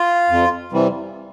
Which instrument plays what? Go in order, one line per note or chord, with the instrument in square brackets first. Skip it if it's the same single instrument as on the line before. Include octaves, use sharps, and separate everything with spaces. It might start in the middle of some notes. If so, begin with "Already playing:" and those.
Already playing: [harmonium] F4
F2
C3 E3 G3